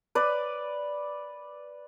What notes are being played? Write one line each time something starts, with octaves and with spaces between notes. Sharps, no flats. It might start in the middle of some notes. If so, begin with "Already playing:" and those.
B4 D5